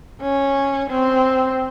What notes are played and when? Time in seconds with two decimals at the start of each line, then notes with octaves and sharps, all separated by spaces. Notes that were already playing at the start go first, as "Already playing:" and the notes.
0.22 C#4
0.90 C4